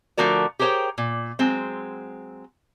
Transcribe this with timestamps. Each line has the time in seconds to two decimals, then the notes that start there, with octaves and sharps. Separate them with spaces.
0.17 D3 F3 A3 F#4 A#4 D5
0.59 G4 G#4 A#4 C5 C#5 G5
0.98 A#2
1.39 F#3 G#3 C4